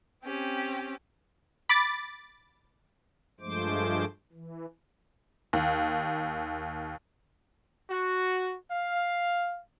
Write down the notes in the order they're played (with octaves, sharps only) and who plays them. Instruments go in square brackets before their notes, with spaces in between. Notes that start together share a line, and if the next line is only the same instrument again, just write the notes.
[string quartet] C4 C#4 G4
[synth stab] B5 D6 A6
[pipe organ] G2 F3 G#3 A3 C5 D6
E3
[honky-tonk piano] D#2
[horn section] F#4
F5